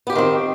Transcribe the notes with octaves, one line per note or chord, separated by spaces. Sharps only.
D#3 B3 C4 F4 G4